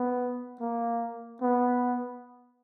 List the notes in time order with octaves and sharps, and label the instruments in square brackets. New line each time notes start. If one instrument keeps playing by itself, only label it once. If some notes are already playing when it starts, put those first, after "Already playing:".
Already playing: [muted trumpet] B3
A#3
B3